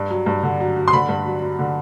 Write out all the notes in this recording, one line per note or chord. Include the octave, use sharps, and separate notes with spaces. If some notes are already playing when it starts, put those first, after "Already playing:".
Already playing: G2
F#3
G2
D3
F#3
F#3
C6
D3 B5
G2
F#3
F#3
D3